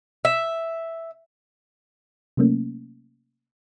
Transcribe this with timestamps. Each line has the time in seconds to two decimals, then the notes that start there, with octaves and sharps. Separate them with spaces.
0.25 E5
2.37 C3 F#3 A3 A#3 C#4